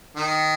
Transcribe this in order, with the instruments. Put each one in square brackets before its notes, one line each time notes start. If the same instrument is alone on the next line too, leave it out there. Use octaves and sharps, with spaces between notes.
[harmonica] D#3